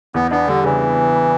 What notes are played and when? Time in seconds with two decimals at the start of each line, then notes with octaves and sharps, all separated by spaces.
0.14 E2 B3
0.31 B3 D4
0.47 D3 G3
0.64 C#3 E3